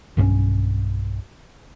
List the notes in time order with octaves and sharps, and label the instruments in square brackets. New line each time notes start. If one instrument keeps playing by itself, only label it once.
[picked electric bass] B1 G2 F#3 C#4